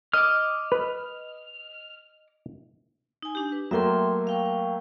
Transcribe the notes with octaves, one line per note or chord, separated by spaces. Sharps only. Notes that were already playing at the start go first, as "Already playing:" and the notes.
D#5 D6 F6
B4
D#4 G#5
D4 G4
B4
F#3 A3 A#3 E5 G5 C6
F5 G5 C#6